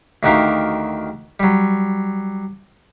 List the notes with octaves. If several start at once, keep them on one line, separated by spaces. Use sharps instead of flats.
D2 D#3 F#4 G4 A#4 F5
F#3 G3